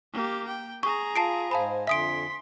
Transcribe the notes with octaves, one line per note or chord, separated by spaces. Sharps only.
A#3 G4
G5
G#4 A#5 C#6
F4 A5 C7 D7
G#2 C5 F5 G#5 A5 B5
F2 D3 E5 G#5 C6 D#6 B6 D7